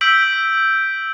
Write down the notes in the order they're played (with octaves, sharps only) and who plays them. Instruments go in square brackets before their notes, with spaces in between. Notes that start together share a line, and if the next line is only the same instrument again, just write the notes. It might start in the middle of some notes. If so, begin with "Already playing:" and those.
[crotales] E6 G6 B6 D7 F#7